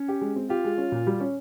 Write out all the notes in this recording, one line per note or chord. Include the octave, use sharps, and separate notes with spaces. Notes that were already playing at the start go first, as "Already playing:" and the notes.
Already playing: C#4
G4
G#3
C4
F4 G4
G#3
C#4
A#2
G3
C#4